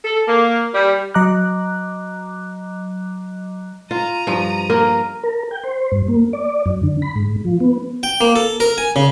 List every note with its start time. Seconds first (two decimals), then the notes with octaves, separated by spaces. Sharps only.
0.05 A4
0.27 A#3
0.74 G3
1.14 F#3 D#5 A#5 D6 F#6
3.91 F4 A#5 D#7
4.27 G2 F3
4.70 A#3 A#4
5.23 A#4
5.51 G5
5.64 C5
5.92 G2
6.08 A#3
6.33 D5
6.66 F#2
6.83 D3
7.02 B5
7.16 G#2
7.45 F3
7.60 B3
8.03 G5
8.21 A#3
8.36 A4
8.60 A#4
8.78 G#5
8.96 C#3